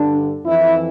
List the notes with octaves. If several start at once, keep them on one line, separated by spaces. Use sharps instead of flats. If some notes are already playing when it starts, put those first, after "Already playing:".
Already playing: G2 D3 D4
F2 E3 E4